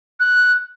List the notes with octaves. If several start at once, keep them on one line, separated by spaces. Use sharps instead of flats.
F#6